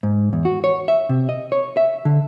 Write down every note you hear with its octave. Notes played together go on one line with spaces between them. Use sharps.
G#2
E2
F#4
C#5
E5
C3
D#5
C#5
E5
D3